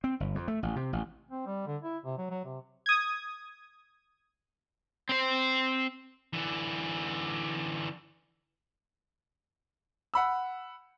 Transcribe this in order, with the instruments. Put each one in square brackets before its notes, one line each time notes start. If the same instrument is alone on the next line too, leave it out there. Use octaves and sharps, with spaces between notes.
[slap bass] C4
G1
F2
A3
A1
C3
A1
[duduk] C4
G3
D3
E4
C3
F#3
F#3
C3
[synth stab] D#6 G#6
[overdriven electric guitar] C4 C5
[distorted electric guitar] D3 E3
[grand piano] F#5 B5 E6